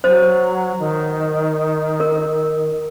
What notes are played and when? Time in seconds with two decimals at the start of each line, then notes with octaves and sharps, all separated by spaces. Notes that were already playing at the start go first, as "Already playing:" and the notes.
0.04 F#3 C5
0.79 D#3
2.00 A#4